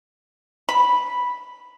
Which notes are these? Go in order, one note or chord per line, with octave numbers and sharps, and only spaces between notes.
B5